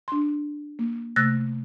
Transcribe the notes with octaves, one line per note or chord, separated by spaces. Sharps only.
D4 C6
A#3
C3 A3 E6 F#6 A6 A#6